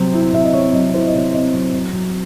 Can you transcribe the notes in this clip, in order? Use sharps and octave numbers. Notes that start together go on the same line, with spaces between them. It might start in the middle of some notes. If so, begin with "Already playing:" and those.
Already playing: C3 F#3 C4 C5
E4
C3 E5
D#5
C4 C#5
F#3 D#5
E4 C5
D#5
C3 C#5
C4 D#5
F#3
F#3
F#3